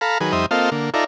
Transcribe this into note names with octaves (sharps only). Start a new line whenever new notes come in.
A4 F5 A#5 B5
D#3 F#3 G#4 B4
F2 G3 D#4 C5 E5 D#6
A#3 C4 F4 A4 D#5 F5
D3 A#3
D#4 F4 A4 D5 E5 A#5